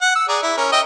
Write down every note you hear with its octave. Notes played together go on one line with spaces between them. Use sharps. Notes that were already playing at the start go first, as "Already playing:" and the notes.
F#5
E6
G#4 D5 A#5
E4
C#4 A#4
D#5 E5 G5